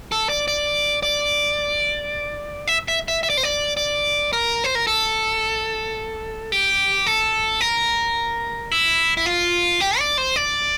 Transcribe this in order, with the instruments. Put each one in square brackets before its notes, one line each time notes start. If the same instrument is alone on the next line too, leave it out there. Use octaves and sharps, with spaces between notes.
[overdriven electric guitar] A4
D5
D5
D5
E5
E5
E5
E5
D5
C5
D5
D5
A#4
C5
A#4
A4
G4
A4
A#4
E4
E4
F4
G4
D5
C5
D5